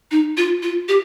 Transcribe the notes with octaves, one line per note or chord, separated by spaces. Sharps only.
D#4
F4
F4
G4